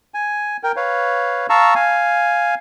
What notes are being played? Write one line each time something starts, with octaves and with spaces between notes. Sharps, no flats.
G#5
A#4 G5
B4 C#5 F5
F5 A5 A#5 C#6 E6
F5 G#5